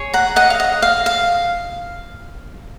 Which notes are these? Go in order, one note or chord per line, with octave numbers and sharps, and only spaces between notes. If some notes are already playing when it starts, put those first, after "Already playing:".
Already playing: G#4 C#5
F#5 A#5
D#5 F#5
F5
D#5
F5
F5